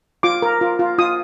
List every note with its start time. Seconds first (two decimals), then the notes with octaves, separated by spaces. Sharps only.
0.23 F4 D6
0.42 A#4
0.61 F4
0.79 F4
0.98 F4 D#6